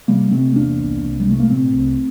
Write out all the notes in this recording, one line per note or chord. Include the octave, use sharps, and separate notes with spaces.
C3 G3 A#3
C3 A3 C4
E2 A#3 D4
C2
C2
G3
C3 A3
A#3
A#2 A3 C4
C2